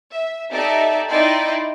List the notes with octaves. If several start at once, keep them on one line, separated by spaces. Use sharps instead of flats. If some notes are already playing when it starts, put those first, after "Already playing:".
E5
D#4 G4 A4 D5 E5
D#4 E4 D5 D#5 G5 C6